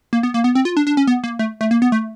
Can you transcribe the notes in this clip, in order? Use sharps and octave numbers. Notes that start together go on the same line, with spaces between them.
A#3
B3
A#3
B3
C4
F4
D4
D4
C#4
B3
A#3
A3
A3
A#3
B3
A3